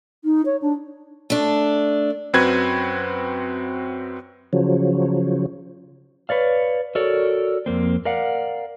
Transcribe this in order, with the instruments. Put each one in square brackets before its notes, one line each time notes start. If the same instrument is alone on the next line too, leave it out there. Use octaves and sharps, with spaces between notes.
[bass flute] D#4
C#5
D4
[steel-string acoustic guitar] A3 D4
[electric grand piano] F#2 C4 F#4 B4 G#6
[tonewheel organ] C#3 F3 F#3
[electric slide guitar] B4 C#5 D5 F5
F#4 A4 A#4 C#5 D5
F2 A#3 C4
A#4 D5 F5 F#5